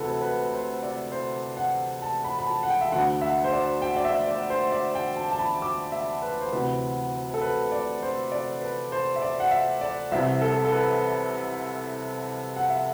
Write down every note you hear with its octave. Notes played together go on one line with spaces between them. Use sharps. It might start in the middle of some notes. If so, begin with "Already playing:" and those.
Already playing: D2 C3 E3 A4 B4
B4
C5
D5
C5
F#5
A5
B5
B5
A5
F#5
G5
E5
D2 D3 F#5
E5
C5
D5
G5
D5
E5
D5
C5
D5
G5
A5
A5
B5
D6
E5
B4
C5
D2 C3 E3 B4
A4
B4
D5
C5
D5
B4
C5
E5
D5
F#5
E5
D5
C2 C3 E3 E5
A4
A4
B4
F#5
E5